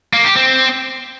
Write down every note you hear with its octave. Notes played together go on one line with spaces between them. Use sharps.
A#3
G4
C4